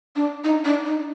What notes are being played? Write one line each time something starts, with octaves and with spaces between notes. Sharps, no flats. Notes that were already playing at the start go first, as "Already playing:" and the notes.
D4
D#4
D4
D#4